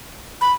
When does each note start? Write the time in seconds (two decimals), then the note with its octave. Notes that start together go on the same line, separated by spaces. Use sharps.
0.41 B5